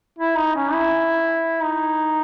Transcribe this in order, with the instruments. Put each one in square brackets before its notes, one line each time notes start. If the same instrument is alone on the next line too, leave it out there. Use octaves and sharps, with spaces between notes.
[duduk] E4
D#4
C#4
E4
D#4